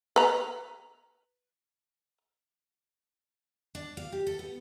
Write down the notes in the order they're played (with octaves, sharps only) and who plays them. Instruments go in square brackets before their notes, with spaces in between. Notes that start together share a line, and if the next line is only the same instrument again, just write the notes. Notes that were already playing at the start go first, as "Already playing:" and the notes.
[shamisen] B4 A#5
[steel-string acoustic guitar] D4
F5
G4
A4
B3